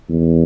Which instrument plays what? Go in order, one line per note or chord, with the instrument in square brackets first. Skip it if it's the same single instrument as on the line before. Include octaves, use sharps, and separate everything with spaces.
[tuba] E2